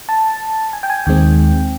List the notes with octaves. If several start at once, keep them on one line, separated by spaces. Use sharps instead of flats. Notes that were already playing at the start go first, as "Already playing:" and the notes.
A5
G#5
G5
G#5
D#2 D#3 G#3 C4 G5